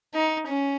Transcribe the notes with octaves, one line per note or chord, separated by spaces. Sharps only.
D#4
C#4